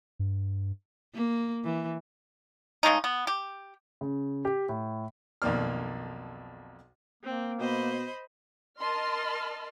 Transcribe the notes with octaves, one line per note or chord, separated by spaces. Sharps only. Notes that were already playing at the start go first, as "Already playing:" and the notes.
G2
A#3
E3
C#3 G#3 A3 D#4
B3
G4
C#3
G4
A2
B1 F2 D#3 A#3 D5 F6
A#3 C4
B2 C5 D#5 B5
A#4 D#5 A5 C6 F6